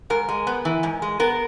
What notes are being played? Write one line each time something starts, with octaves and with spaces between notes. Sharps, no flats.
G#2 A#4
G#3
B3
E3
G#2
G#3
B3 A#4